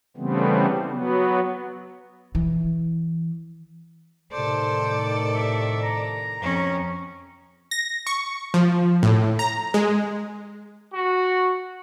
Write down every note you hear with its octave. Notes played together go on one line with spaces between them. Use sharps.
C#3 E3 G3 A3 B3 C4
F#3 B3
E3
A2 C3 D#3 A4 C5 D5
E5
A#5
F2 C#4
A#6
C#6
F3
A2
A#5
G#3
F#4